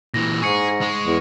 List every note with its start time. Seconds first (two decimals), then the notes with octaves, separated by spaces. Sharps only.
0.14 A#2 E3 A#6
0.42 G#2 G#4 C#6 C#7
0.81 G#3
1.07 E2